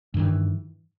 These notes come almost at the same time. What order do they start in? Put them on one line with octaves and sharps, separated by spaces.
G2 D#3 E3